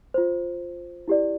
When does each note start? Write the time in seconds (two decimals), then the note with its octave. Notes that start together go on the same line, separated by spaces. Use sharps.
0.14 F4 C5
1.08 E4 G4 D5